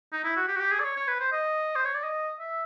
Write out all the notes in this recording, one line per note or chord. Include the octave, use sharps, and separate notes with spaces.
D#4
E4
F#4
G4
F#4
G4
G#4
D5
C#5
C#5
B4
C5
D#5
C5
C#5
D5
D#5
E5